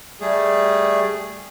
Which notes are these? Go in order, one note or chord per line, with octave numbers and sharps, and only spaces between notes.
G3 A3 G#4